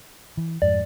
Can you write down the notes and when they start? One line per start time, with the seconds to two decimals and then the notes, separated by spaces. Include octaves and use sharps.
0.37 E3
0.62 F2 G#2 D5